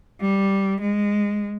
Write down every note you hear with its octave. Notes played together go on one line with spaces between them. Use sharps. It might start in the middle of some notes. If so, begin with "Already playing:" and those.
G3
G#3